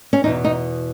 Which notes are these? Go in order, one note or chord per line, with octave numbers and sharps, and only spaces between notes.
C#4
E2 B2 D#4
D#4